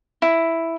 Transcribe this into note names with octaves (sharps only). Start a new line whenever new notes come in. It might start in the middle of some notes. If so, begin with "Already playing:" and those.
E4